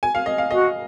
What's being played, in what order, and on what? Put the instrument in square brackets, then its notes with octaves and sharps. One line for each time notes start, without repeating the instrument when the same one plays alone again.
[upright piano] G#5
F5
D#5
F5
[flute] F#4 [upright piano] D#5